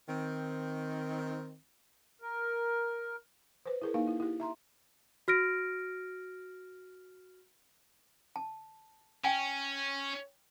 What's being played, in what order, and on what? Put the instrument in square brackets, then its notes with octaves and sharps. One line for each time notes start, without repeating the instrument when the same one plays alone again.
[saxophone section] D#3 C4
[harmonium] A#4
[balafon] B4 C5
E4 G#4 A#4
A#3 D#4 F5
E4
E4 G4
E5 A#5 C6
[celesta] F#4 F6 A#6 D7
[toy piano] A5
[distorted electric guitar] C#4 [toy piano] G5 G#5